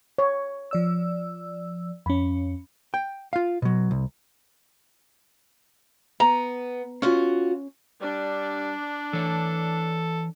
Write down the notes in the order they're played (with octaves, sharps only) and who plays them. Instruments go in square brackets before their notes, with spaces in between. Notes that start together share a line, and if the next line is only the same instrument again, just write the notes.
[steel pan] C#5
[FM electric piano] F3 D5 E6
[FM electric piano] F2 C#4 [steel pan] B5
[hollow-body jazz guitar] G5
F4 F5
B2 F#3
C2
[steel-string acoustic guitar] B3 [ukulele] A#5
[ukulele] C#4 [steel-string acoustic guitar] F4 F#4 F5
[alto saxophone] G3 [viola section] D4
[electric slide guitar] E3 C#5 [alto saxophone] A4